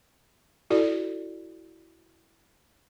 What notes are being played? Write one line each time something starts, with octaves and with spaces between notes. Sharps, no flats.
E4 F#4 A4 D5